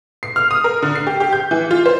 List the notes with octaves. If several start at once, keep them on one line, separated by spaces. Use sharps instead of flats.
C7
F6
D#6
A#4
D3
C7
G4
G4
G6
E3
F4
C5